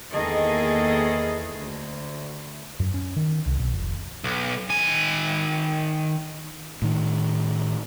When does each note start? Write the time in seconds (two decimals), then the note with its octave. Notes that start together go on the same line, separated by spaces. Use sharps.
0.13 E2 D#3 A#3 G#4 A4 D#5
1.56 D2
2.80 F#2
2.94 C#4
3.16 D#3
3.46 C2
3.59 B1
3.74 F1
4.24 B1
4.70 D#3 G#5
6.82 A2 D#3